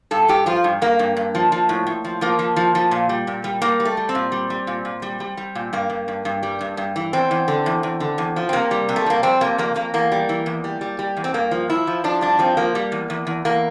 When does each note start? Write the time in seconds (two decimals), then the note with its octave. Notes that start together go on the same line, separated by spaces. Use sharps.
0.11 G2 A4
0.29 G2 G4
0.46 F3 F4
0.64 G2
0.82 G2 A#3
0.99 G2
1.17 G2
1.35 F3
1.52 F3
1.69 A2
1.87 A2
2.05 F3
2.21 F3 A#3
2.39 F3
2.56 F3
2.75 F3
2.91 A#2
3.09 G3
3.27 A#2
3.44 G3
3.62 G3 A#3
3.80 G3
3.85 A3
3.97 G3
4.09 C4
4.15 A#2
4.32 G3
4.50 G3
4.67 A#2
4.85 A#2
5.02 G3
5.20 G3
5.37 G3
5.55 A#2
5.73 G2 A#3
5.90 G2
6.08 G2
6.25 G2
6.43 G3
6.61 G2
6.77 G2
6.96 E3
7.13 E2 C4
7.31 E2
7.48 D3
7.66 E2
7.83 E2
8.00 D3
8.18 E2
8.36 F3
8.49 C4
8.53 C3 A#3
8.71 G3
8.89 C3
8.96 A3
9.06 G3 A#3
9.23 F2 C4
9.41 C3 A#3
9.58 F2 A#3
9.76 F2 A#3
9.94 E2 A#3
10.12 G3
10.29 E3
10.46 E2
10.64 G3
10.81 G3
10.99 G3
11.17 E2
11.24 C4
11.34 G2 A#3
11.51 F3
11.70 F3 E4
11.87 F3
12.04 F3 D4
12.21 G2 D4
12.39 F3 C4
12.57 F3 A#3
12.75 G3
12.92 E2
13.10 E2
13.27 E2
13.45 E2 A#3